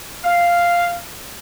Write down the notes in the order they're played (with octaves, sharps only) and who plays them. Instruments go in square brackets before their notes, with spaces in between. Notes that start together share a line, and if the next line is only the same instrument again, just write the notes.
[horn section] F5